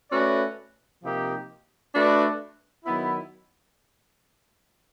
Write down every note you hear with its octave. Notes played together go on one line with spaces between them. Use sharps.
A3 C#4 F#4 B4 D5
C3 F3 A#3 D#4 G4
A3 D4 F#4 B4 D5
D#3 F#3 B3 E4